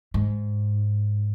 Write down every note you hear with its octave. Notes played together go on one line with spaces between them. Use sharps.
G#2